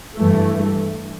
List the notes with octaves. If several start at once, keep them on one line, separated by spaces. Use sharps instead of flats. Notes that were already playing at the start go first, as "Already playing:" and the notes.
G2 E3 A3